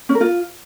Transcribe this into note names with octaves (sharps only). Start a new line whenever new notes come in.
C#4
A#4
F4